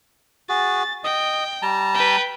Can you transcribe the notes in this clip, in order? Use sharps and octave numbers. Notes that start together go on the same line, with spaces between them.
F#4 G#4 A6
D#5 G5
G3 A5 A#5
B4 G5